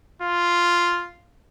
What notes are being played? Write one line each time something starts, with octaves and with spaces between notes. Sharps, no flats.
F4